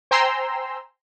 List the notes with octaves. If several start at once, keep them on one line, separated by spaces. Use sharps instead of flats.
C5 G5 G#5 A#5 C6 E6